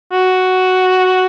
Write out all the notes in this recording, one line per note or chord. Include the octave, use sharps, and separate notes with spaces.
F#4